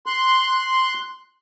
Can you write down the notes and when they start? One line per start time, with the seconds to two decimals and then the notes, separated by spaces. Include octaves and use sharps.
0.06 C6 F#6